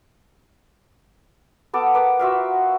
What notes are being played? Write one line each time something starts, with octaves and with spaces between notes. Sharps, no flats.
B3 A4 D6
B3 A#4 B4 D6
F4 F#4 E5 F5